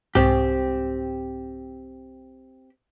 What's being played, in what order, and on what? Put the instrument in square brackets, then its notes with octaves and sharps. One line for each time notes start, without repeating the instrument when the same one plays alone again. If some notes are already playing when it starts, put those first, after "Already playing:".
[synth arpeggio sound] C2 G#2 [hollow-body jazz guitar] C4 G4